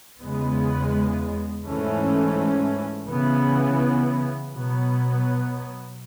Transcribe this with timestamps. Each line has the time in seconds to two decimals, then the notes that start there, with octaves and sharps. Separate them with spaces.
0.20 E2 C#3 G#3 B3
1.64 G#2 E3 A3 C#4
3.08 C#3 E3 B3
4.52 B2 F#3 B3